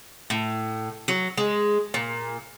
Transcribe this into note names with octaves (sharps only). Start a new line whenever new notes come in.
A2
F#3
G#3
A#2